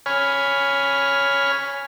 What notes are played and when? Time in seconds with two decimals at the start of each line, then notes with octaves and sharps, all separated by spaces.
0.06 C#5 G#5 B5 F6